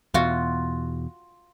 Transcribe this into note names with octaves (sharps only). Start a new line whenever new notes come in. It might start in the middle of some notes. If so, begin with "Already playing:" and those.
E2 B2 F4 F#4